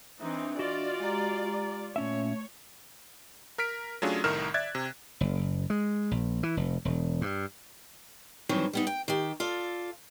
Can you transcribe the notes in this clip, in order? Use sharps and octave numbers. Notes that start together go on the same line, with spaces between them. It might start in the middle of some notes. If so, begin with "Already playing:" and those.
E3 C4 D4 D#4 E5
F4 F#4 D5 D#5
G#3 G4 A#5
A#2 A3 C#4 C#5 E5
A#4 F6 B6 D7
F#3 A3 C#4 D4 F4 G#4
C2 A2 D#3 A#4 F6 E7
D5 E5 F#6 G#6 A6
C3
F#1
G#3
A#1
E3
F1
E1
G2
G2 D#3 E3 F#3 C4
G3 B3 D#4
G5
D#3 G4
F4 A4 D5